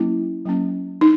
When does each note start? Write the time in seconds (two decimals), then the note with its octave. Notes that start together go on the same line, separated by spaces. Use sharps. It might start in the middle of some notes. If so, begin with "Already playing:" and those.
Already playing: F#3 A#3 C#4 E4
0.45 F#3 A#3 C#4
1.01 D#4